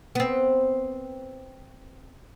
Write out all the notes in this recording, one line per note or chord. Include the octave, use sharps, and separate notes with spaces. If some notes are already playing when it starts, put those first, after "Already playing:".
B3 C4